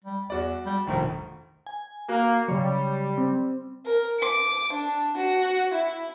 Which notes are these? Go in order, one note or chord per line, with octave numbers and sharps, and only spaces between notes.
G3
E2 F#4 D5
G3
F1 A#1 D#3
G#5
A#3 F#4
C#3 F#3 G3 C#5
C4
A#4
D6
D4
F#4
E4